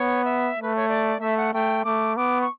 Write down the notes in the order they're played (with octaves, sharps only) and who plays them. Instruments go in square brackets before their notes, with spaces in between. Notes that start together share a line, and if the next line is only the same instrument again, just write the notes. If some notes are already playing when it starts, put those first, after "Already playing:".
Already playing: [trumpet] B3 [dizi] C#5
[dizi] E5
[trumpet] A3 [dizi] B4
[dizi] C#5
D5
[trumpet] A3 [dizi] E5
[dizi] F#5
[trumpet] A3 [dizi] G5
[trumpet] A3 [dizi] D6
[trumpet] B3 [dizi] D6
[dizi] C#6